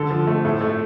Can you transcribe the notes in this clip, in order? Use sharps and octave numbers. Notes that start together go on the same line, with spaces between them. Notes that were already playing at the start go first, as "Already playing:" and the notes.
Already playing: D3 A4
F3
A3
A2 A4
A3